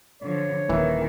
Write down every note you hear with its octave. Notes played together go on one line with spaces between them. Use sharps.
D3 F3 C#5
D#1 D#3 E3